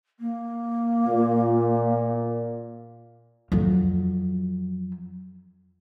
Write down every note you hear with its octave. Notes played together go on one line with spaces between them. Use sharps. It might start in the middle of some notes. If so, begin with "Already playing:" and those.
A#3
A#2
F2 F#3